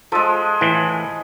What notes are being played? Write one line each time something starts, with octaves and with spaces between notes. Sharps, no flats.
F3 G#3 A4
A2 E3